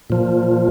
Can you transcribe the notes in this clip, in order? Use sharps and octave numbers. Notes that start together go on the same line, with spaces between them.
A#2 F3